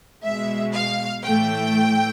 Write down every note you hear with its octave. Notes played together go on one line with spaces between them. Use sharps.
B2 G#3 E5
F5
A2 E3 A3 G5